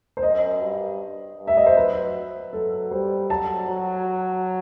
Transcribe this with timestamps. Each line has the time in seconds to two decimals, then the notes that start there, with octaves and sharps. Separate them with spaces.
0.17 C5
0.22 F#2 D#5
0.61 G2
1.38 G2
1.47 E5
1.57 D#5
1.66 C5
1.76 F#3 B4
2.53 F#3 A4
2.91 G3 C5
3.30 F#3 A5
3.68 F#3